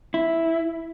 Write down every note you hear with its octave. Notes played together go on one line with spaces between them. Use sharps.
E4